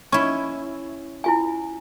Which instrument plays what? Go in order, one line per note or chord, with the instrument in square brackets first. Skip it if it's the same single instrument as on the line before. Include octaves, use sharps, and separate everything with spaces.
[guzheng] C#4 E4 [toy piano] C#6
[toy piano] E4 F4 G#5